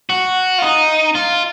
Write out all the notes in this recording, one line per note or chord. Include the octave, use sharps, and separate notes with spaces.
F#4
F4
D#4
F4